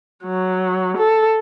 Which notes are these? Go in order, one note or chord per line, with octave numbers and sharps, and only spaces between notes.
F#3
A4